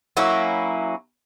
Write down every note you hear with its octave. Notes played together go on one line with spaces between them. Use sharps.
F#3 A#3 C#4 E4